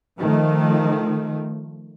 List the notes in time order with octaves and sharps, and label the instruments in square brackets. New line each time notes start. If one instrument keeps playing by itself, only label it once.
[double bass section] D#3 F3 A3